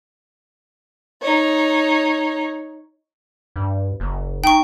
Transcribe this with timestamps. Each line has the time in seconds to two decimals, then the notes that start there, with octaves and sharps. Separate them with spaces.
1.21 D#4 C#5
3.56 G2
4.00 F#1
4.44 D#4 G5 C#6